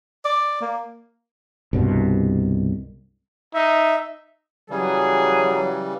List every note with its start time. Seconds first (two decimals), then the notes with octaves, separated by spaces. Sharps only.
0.25 D5
0.61 A#3
1.73 C2 G2 B2
3.54 D#4 E5
4.70 C#3 E3 F#3 G3 G#4